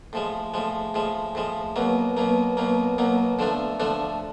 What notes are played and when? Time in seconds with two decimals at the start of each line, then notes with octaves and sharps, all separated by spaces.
0.13 A2 F3 G#3
0.54 A2 F3 G#3
0.94 A2 F3 G#3
1.35 A2 F3 G#3
1.76 B2 F#3 A#3
2.17 B2 F#3 A#3
2.57 B2 F#3 A#3
2.98 B2 F#3 A#3
3.39 D3 F3 A3 D4
3.80 D3 F3 A3 D4